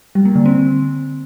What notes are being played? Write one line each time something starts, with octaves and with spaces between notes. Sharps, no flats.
G3
A#3
D3
C4